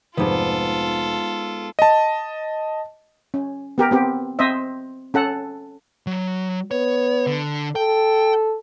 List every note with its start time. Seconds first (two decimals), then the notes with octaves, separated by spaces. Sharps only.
0.17 F1 G#2 B3 F4 A4
1.79 D#5 A5
3.34 C#4
3.78 B3 G4 A#4
3.91 B3 C4 G4
4.39 C4 C5 D#5 E5
5.14 C#4 A4 F#5
6.07 F#3
6.71 B3 C#5
7.27 D3
7.76 A4 G5